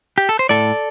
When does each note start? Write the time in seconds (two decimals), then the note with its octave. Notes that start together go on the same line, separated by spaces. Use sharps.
0.18 G4
0.29 A4
0.39 C5
0.49 A2 A4 D5